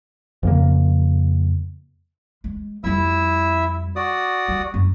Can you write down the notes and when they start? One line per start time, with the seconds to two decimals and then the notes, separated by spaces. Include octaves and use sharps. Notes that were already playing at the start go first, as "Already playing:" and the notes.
0.43 F2 C#3 A#3
2.44 G#3
2.84 F2 G3 E4 E5 E6
3.96 F#4 D5 D#6
4.48 G3
4.74 F#2